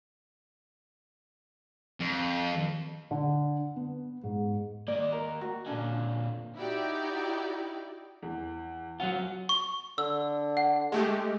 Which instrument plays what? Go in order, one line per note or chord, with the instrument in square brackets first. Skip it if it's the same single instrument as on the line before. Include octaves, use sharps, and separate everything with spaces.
[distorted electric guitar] F2
[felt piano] D3
B3
G#2
[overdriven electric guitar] A#3 D#5 [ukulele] D5
[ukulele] A#4
F#4
[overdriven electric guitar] A#2 D3 [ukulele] C#4 D4 A5
[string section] D#4 E4 F#4 G4 D5 G5
[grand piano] E2
[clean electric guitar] F#3 C#4 F4 [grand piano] F#5
[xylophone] C#6
[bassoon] D3 [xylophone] E6
[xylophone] F#5
[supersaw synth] G#3 A3 G4